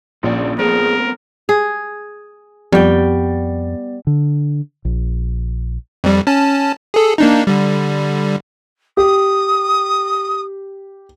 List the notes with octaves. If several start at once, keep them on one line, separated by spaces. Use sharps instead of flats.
A#1 A#2 C#4 D4
A3 B3 C4 G#4 A#4
G#4
F2 G3 B3 D5 G5
D3
A#1
F2 G3
C#4 A5
G#4 A4
A#3 D4 D#4
D3 G3
G4 D#6